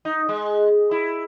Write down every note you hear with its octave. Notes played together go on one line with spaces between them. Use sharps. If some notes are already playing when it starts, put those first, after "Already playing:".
D#4
G#3
E4